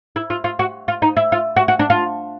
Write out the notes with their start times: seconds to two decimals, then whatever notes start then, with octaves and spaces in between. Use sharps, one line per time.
0.16 E4
0.30 F4
0.44 F4
0.59 F#4
0.88 F4
1.02 D#4
1.17 E4
1.32 F4
1.56 F#4
1.68 F#4
1.79 D4
1.90 F4